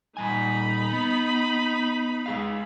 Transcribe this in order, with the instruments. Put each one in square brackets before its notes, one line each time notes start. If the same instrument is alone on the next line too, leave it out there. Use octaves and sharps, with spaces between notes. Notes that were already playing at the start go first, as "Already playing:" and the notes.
[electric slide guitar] A#2 G3 G#5 [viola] D#4 B5
[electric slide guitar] B3
G#3 G#4 F5